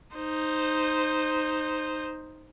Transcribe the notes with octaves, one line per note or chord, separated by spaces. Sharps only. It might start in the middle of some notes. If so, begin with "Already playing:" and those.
D#4 C5